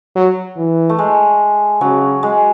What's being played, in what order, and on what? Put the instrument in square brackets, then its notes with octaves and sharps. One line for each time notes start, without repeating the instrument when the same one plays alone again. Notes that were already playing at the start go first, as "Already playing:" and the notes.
[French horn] F#3
E3
[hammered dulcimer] A3
G#3
[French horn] C#3 [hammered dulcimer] F#3
[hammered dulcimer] G#3